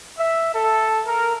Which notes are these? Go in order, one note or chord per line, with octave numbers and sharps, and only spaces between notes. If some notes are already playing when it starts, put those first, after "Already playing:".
E5
A4
A#4